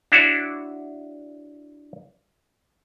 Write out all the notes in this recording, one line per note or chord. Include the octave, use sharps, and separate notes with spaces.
D4 E4 F#4 C#5